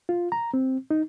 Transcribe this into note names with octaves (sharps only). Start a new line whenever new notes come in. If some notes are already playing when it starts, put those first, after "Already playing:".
F4
A#5
C4
D#4